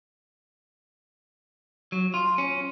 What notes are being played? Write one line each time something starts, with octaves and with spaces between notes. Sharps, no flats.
F#3
F4
C#4